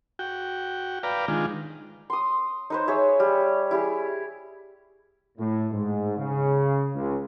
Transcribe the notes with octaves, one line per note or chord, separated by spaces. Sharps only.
F#4 G5
B4 D5 F5 G5 A#5
D#3 G#3 D4 F4
C6 D#6
D#4 B4 C5
G#4 C#5 E5
G3
E4 G4 G#4
A2
G#2
C#3
C#2